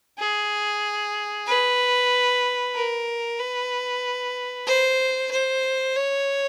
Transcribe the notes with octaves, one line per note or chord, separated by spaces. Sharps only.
G#4
B4
A#4
B4
C5
C5
C#5